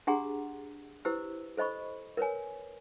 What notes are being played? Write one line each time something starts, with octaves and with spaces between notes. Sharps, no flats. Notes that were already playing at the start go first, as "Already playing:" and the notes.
D4 G4 G#4 F#5 A#5 C6
E4 G4 B4 C5 E6
A4 C5 D#5 B5 C#6
A#4 B4 C#5 G#5